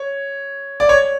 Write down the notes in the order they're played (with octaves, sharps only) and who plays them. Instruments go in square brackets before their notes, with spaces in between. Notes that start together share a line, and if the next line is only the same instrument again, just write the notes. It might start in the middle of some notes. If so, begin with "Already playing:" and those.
Already playing: [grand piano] C#5
D5
C#5